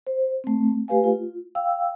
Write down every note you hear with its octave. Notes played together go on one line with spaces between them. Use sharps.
C5
A3 C4
A3 G4 B4 F5 G#5
F4
F5 G5 E6